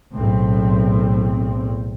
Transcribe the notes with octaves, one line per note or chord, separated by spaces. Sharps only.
B1 E2 A2 C4